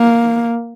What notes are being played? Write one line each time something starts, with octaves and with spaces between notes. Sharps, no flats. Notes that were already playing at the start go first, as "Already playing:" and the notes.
Already playing: A#3